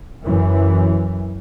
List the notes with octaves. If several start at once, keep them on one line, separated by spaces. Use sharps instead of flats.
F#2 E3